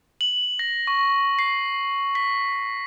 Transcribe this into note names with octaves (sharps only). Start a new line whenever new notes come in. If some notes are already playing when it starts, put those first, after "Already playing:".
F#7
A#6
C#6
C7
B6